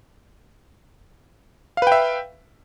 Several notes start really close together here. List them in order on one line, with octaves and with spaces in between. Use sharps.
F5 B4 G5 E5